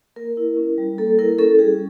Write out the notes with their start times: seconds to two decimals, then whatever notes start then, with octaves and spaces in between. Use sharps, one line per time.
0.16 A#3 A#4
0.37 E4
0.57 C#4
0.78 G3
0.98 A#3 A4
1.19 E4 A#4
1.39 C#4 A4
1.59 G3 G#4